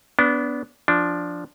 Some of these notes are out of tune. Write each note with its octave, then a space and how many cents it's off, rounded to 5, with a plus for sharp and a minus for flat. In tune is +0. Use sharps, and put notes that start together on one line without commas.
B3 +0 D4 -25
F3 +0 D4 +0